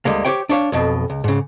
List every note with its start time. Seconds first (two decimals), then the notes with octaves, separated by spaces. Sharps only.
0.05 D2 G3 G#3 A#3
0.25 G4 C5 C#5 G5
0.49 D4 C#5 F5
0.72 B1 F2 B2
1.10 C#2
1.24 G#2 C#3